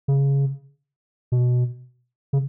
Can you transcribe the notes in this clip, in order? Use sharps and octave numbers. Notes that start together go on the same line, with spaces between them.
C#3
B2
C#3